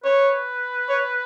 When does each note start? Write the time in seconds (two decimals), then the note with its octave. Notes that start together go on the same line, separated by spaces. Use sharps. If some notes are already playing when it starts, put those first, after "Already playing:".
0.04 B4 C#5
0.89 C#5